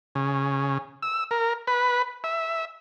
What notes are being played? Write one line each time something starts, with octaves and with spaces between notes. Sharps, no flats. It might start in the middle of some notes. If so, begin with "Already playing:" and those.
C#3
E6
A#4
B4
E5